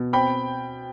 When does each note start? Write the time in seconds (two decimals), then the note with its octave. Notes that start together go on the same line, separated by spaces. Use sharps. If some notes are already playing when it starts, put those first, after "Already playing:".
Already playing: B2
0.13 C4 G5 B5